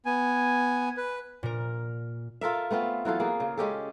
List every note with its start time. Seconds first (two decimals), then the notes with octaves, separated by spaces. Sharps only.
0.06 B3 G#5
0.97 B4
1.43 A#2 A#4
2.41 F4 A4 A#4 E5
2.71 A3 B3 C4 F4
3.05 E3 F#3 F4 A4
3.20 A#3 G#4
3.40 C#3
3.58 G#3 C#4 G4 A4